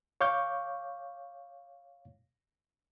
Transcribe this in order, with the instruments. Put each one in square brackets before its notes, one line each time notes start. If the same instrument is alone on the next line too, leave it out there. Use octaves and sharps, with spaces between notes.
[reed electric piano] C#5 F5 C#6 D6 G6